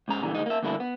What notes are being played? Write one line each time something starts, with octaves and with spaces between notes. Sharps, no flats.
C#2 G#2 C#3 A#5
A#2 D3 E3 G3
D2 G#3 D#4
A#3 E5
D2 G2 D3 A#3 E4
B3